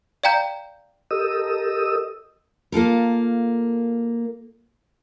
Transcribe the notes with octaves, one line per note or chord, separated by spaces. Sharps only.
D5 F5 G5 A#5 G6
G4 A4 A#4 D#5 D#6 E6
A#3 F4 A4 A#4